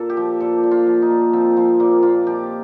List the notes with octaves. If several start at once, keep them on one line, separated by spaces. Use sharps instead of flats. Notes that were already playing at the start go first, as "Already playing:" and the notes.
Already playing: A#2 A4
G4
F3
A#2 A4
A#2
F4
F3
D#4
A#2
F3 C4
F3 C4
A#2 A#3
A#2 F4
F3 G4